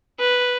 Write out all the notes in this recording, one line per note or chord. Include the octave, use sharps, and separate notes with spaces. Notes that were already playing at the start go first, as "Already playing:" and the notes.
B4